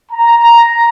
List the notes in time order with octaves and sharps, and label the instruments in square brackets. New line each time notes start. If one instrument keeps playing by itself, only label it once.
[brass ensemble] A#5